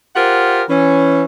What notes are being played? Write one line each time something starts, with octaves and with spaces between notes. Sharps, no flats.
F4 G4 A#4 C5 F#5
E3 C#4